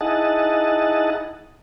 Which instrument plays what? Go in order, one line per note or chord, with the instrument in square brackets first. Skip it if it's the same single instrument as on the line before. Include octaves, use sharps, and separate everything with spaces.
[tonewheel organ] D#4 E4 G#4 D#5 F#5 A5